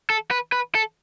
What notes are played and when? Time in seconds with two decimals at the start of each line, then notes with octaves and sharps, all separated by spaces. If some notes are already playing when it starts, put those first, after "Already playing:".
0.10 A4
0.31 B4
0.52 B4
0.75 A4